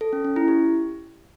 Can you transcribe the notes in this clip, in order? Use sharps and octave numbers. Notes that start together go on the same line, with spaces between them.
A4
C#4
C#4
E4
G4